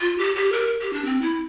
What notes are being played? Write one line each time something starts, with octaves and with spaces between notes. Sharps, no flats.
F4
G4
G4
A#4
G4
D4
C4
E4